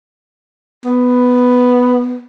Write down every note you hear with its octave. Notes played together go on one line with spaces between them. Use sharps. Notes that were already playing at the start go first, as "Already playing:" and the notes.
B3